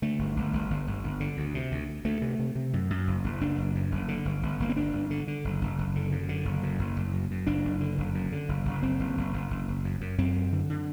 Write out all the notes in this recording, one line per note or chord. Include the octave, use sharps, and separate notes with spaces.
D3 A3
G1
G1
G1
G1
G1
G1
D3
D2
C3
D2
D2
D2 A3
C3
C3
C3
F#2
F#2
F#1
F#1
F#1 D4
F#1
F#2
F#1
D3
G1
G1
G1 A#3
C4
G1 D4
G1
D3
D3
F#1
F#1
F#1
D3
F#2
D3
F#1
F#2
F#1
F#1
F#2
F#2
F#1 D4
F#1
D3
F#1
F#2
D3
F#1
F#1
F#1 C4
F#1
F#1
F#1
F#1
F#1
F#2
F#2
F#2 C4
F#2
D3
D3